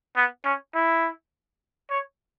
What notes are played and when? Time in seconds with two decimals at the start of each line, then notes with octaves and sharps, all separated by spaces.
0.16 B3
0.45 C#4
0.75 E4
1.90 C#5